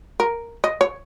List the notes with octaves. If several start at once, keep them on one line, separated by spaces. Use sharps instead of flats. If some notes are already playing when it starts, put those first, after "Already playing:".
A#4
D#5
C#5